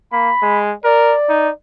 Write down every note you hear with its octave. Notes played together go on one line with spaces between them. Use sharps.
A#3 B5
G#3
A#4 D5
D#4